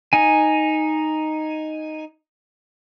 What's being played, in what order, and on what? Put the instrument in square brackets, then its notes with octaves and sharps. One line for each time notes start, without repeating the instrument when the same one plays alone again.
[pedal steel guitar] D#4 G#5